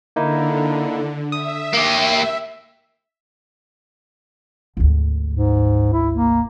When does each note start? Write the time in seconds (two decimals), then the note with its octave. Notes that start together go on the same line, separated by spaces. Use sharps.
0.16 D3 A#3 D#4 E4
1.32 E5 D#6
1.74 A#3 G4
4.77 G#1 D2
5.33 G#2
5.93 E4
6.14 A#3